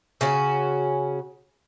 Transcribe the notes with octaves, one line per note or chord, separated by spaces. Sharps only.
C#3 C#4 F#4